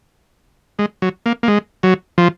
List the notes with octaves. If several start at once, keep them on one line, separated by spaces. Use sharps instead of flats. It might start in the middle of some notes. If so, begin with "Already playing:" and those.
G#3
F#3
A#3
A#3
G#3
F#3
F3